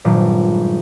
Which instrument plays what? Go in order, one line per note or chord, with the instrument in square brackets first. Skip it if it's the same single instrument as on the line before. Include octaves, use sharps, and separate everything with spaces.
[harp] G#1 G2 A#2 F#3